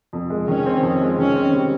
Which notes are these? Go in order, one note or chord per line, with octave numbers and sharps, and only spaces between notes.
F2
G#3
D#3 C#4
C4
F2
G#3
D#3 C#4
C4
G3